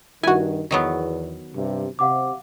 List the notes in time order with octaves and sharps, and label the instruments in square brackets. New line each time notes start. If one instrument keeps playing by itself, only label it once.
[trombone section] G2 D#3 [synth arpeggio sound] E4 F#4 [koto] G#5
[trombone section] E2 [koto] D#3 F#3 B3
[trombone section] G2 C3
[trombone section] C3 [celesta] F5 F#5 D6